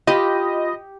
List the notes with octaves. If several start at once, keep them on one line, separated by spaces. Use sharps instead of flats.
F4 G4 D#5 B5